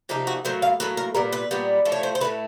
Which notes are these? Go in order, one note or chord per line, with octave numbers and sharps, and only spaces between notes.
C3 F3 A#3 D#4 G4
F#4
A2 F#3 A#3 C5
F5
A2 F#3 A#3 B4
A#4
A#2 G3 B3 A#4
B4
A#2 G3 B3
A2 F3 A3
C#5
C5
C5
A2 F3 A3 B4